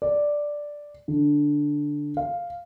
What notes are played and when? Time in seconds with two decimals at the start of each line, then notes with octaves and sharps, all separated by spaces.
0.02 D5
1.08 D3
2.17 F5